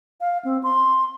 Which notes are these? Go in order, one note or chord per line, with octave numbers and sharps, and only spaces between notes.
F5
C4
C6